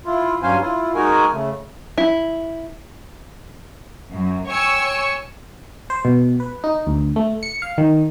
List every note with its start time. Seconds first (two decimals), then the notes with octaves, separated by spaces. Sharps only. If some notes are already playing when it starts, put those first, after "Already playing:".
0.06 E4 F4
0.43 G2 F#3 C#4 C5 F5 G#5
0.61 E4 F4
0.95 G#3 D#4 F#4 A#4 G#5
1.32 C#3 A3
1.98 E4
4.09 F#2
4.46 C#5 G5 G#5 C#6 E6 C#7
5.90 C5
6.05 B2
6.40 B4
6.64 D#4
6.87 D2
7.16 A3
7.43 C#7
7.62 F5
7.78 D#3